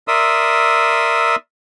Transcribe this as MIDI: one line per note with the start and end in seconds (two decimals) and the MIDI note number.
0.08 1.36 70
0.08 1.36 74
0.08 1.36 76
0.08 1.36 84
0.08 1.36 87
0.08 1.36 88